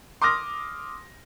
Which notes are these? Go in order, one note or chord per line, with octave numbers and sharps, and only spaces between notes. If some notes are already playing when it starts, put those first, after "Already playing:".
C6 D6 D#6 F6 A#6